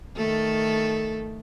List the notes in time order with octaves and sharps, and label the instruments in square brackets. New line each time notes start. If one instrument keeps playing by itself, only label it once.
[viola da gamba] D#3 A3 A4